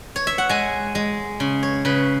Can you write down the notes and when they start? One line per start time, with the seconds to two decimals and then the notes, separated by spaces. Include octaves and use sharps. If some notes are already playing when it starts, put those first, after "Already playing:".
0.16 C#5
0.27 E5
0.38 F#5
0.49 G#3 G#5
0.95 G#3
1.40 C#3
1.63 C#5
1.85 C#3 B4